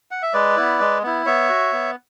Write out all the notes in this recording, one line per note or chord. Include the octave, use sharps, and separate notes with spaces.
F#5
E5
G#3 B4 D5
B3 E4
G#3
B3 E4
B3 C#5 E5
F#4
B3